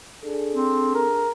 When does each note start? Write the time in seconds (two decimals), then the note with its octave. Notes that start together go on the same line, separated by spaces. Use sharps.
0.24 D4 G#4 A4
0.53 C4
0.95 A#4